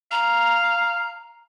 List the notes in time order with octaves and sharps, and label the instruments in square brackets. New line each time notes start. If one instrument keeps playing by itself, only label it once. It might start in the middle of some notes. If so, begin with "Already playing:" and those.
[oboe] F5 [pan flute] A#5